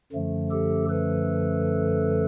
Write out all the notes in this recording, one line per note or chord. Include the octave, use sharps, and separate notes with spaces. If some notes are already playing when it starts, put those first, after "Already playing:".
F#2 D3 F3 A3
G4 A4
A4 B4